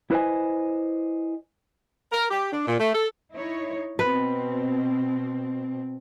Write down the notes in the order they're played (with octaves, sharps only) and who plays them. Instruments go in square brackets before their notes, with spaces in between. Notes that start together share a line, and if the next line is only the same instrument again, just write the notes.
[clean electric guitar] E4 B4 C5 D#5 G#5
[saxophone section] A#4
G4
D4
A#2
A3
A4
[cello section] D#4 E4 C#5
[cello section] B2 C4 [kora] B4